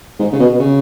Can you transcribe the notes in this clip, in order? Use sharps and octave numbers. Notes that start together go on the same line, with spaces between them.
G#2
C#3
B2
B2
C#3